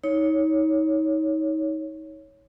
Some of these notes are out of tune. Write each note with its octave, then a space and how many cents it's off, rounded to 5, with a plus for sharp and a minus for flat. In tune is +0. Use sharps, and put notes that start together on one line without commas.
D#4 +30 C#5 +0